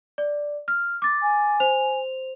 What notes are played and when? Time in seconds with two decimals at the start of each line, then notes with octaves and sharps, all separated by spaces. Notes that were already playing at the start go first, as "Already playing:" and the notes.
0.18 D5
0.68 F6
1.02 D6 A6
1.22 G#5
1.60 C5 F7